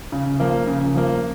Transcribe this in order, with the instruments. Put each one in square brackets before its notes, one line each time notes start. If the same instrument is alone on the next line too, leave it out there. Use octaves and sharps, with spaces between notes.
[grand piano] C#3
F3 A#3
C#3
F3 A#3